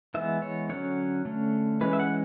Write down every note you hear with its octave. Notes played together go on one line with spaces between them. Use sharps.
E3 G#3 B3 E5
C#5
D3 F#3 C#4 C#5
D3 A3 C#4
E3 G#3 C#4 B4
E5
F#5